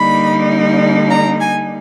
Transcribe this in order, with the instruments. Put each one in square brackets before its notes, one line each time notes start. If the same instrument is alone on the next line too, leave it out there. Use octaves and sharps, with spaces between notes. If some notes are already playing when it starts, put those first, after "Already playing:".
Already playing: [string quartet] D3 G3 A#3 D#4 B5
A#5
G#5